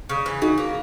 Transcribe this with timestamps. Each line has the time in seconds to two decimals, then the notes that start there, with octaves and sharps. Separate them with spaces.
0.09 C#3
0.26 E3
0.42 C#3 D#4 F#4
0.58 A#3